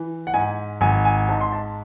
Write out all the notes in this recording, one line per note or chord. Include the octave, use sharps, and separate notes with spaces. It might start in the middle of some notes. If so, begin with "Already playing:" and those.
Already playing: E3
F#5
G#2 G#5
G#1 G#5
G#5
G#2 A5
C6
A5